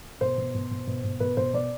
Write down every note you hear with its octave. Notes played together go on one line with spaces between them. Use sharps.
B2 C5
B2
B2
B2
B2
B2
B2 B4
B2 C5
B2 D5